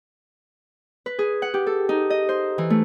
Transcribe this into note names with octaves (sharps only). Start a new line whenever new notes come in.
B4
G#4
F#5
G4
A4
D#4
D#5
C5
E3
A3